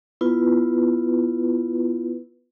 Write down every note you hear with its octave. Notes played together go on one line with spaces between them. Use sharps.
B3 E4 F4 B4